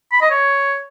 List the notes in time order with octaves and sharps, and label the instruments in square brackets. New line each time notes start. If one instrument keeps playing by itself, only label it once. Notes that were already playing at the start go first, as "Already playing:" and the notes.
[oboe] B5
D#5
C#5